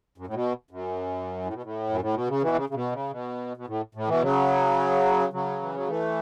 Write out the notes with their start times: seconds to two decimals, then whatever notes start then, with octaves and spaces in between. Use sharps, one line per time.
0.18 F#2
0.27 A2
0.34 B2
0.71 F#2
1.45 A2
1.54 B2
1.63 A2
1.89 F#2
2.00 A2
2.14 B2
2.28 C#3
2.42 B2 E3
2.56 C#3
2.69 C#3
2.74 B2
2.92 C#3
3.11 B2
3.57 B2
3.67 A2
3.95 A2
4.07 B2 E3
4.22 C#3 F#3
5.33 C#3 F#3
5.62 E3
5.75 F#3
5.87 E3 A3